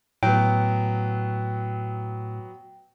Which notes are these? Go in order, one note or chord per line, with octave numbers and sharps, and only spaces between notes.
A2 F#3 B3 G5